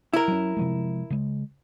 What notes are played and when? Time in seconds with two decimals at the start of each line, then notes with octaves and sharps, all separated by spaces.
0.13 E4 A#4
0.28 F#3 C#4
0.57 C3 F3 G#3
1.10 C#3 G#3